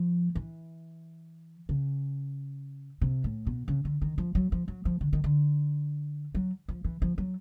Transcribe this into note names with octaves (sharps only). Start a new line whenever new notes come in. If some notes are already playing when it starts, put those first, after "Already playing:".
Already playing: F3
E3
C#3
C3
A2
B2
C#3
D3
D#3
F3
F#3
F3
F#3
F3
D3
D#3
D3
F#3
F3
E3
F3
F#3